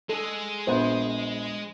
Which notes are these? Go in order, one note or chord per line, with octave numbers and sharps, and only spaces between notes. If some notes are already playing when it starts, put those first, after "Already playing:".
G#3 G#4 A4
A#1 B3 C5